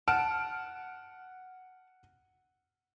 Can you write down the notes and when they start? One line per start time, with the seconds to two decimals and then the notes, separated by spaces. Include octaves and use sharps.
0.08 F#5 A5 F6 D7